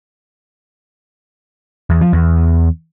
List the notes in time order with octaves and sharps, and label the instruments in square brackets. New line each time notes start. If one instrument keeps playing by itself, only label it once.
[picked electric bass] E2
F3
E2